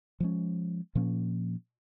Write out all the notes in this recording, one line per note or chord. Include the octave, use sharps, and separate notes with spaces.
F3 G#3 C#4
A#2 F3 A#3 C#4